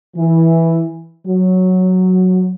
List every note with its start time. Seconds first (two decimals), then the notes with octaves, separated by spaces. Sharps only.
0.17 E3
1.27 F#3